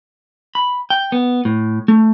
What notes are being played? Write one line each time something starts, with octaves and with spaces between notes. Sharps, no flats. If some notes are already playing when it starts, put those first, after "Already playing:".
B5
G5
B3
A2
A3